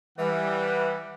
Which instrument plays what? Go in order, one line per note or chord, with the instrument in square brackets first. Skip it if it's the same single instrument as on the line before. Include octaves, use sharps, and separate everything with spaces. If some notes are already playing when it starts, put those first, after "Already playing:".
[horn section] E3 [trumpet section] G3 F#5